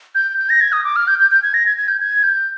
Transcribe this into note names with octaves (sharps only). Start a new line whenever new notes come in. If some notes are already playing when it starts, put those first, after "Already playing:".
G6
G6
A#6
G#6
D#6
D6
F6
G6
G6
G6
G#6
A#6
G#6
G#6
G6
G#6
G6